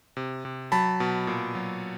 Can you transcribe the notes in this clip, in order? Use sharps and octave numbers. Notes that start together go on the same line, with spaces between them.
C3
C3
F#3 A5 B5
B2
A#2
F#3